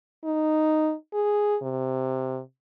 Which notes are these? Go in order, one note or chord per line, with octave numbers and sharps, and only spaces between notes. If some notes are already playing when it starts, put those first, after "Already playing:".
D#4
G#4
C3